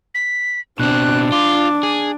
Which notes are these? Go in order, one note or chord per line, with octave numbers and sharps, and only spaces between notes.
B6
B2 C4 D4 F#6
F4 D6
G#4